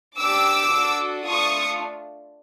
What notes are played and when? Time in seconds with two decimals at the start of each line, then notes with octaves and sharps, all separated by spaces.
0.18 D4 G4 D6 E6
0.73 D4 F#4 A4
1.26 A3 D4 F4 C#6 D#6